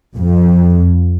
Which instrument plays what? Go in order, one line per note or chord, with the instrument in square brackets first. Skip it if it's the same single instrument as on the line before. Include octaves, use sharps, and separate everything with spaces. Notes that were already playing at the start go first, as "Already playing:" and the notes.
[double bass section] F2